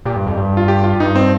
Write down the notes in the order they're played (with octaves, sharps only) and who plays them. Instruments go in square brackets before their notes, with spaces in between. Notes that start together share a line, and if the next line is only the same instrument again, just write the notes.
[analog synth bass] A#2 [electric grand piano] G4
[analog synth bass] G2
F2
G2
[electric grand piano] F4
G4
F4
[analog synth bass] G2 [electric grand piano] D#4
[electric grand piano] C4